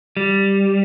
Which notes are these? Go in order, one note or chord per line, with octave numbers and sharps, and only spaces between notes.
G3